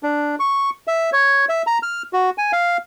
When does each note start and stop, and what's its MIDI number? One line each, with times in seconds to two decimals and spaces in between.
0.03 0.36 62
0.40 0.70 85
0.87 1.10 76
1.12 1.45 73
1.49 1.62 76
1.67 1.78 82
1.83 2.02 89
2.13 2.30 66
2.38 2.52 80
2.53 2.77 77